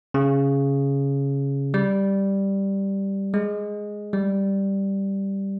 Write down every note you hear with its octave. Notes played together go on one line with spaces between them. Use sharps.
C#3
G3
G#3
G3